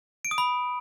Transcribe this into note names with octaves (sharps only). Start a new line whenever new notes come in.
D7
D#6
B5